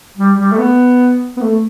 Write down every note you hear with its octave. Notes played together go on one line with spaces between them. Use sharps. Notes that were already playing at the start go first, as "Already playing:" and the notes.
G3
G3
A3
B3
B3
A3